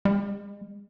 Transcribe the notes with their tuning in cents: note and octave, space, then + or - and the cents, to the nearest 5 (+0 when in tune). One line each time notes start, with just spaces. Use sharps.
G#3 -40